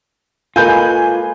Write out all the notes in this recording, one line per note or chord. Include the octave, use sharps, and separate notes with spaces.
G#3 A#3 F4 A4 B4 G#5 G6